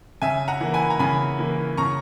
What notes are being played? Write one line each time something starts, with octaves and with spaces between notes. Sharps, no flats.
C#3 E5 G#5
F#5 A#5
E3 A#3
G#5 B5
A#5
C#3 G#5 B5
E3 A#3
C#3 A#5 C#6